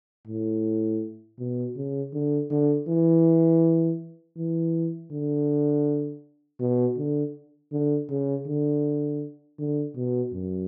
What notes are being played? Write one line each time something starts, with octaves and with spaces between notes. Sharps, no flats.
A2
B2
C#3
D3
D3
E3
E3
D3
B2
D3
D3
C#3
D3
D3
B2
F#2